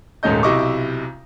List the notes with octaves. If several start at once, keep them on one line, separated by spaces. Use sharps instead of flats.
D#1 G#2 A3 C#4 D#5 G6
B1 C3 E4 D#5 C#6 D6